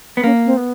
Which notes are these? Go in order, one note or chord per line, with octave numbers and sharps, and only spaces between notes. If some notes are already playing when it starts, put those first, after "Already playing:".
B3
A#3 C#4
C4
B3